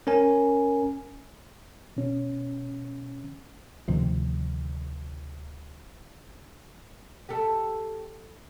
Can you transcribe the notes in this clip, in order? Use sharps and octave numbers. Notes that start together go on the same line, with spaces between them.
C#4 A#4 G#5
B2 C#4
D2 C3 D#3 F3
G4 A4